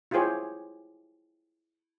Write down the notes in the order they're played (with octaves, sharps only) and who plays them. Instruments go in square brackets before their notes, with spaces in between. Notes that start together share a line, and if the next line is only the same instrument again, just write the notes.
[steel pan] E4 F4 G4 G#4 C5 C#5